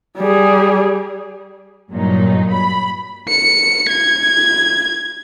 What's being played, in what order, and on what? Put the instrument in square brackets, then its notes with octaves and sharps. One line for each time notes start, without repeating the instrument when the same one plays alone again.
[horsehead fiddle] G3 G#4
[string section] G2 A#2 F#3 D#4
B5
[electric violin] C#7
G#6